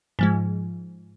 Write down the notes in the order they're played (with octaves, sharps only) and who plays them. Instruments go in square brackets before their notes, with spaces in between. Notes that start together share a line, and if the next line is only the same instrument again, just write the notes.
[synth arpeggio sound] G#2 F3 G#3